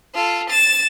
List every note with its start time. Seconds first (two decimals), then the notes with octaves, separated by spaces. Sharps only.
0.14 F4 A4
0.49 A6 E7